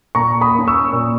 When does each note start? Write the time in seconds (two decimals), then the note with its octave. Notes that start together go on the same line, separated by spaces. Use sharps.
0.15 A#2 A#5 C#6
0.41 B5 D#6
0.55 A#3 C#4
0.67 C#6 E6
0.93 A#2